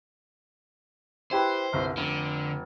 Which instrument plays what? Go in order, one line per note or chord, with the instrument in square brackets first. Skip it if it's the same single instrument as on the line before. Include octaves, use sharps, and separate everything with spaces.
[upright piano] E4 G4 B4 [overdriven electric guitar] C5
[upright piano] G1 C2
[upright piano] F1 [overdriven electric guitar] D3